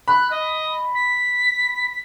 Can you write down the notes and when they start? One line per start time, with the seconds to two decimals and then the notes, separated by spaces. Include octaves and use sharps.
0.08 B5 F#6
0.30 D#5
0.94 B6